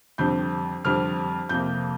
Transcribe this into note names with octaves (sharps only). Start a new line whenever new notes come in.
F2 D3 G3 C4 G6
F2 D3 G3 C4 F6
F2 C3 A#3 G6